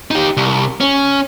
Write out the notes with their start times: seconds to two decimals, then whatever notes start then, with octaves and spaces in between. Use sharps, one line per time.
0.11 D#4 G4
0.37 C2
0.81 C#4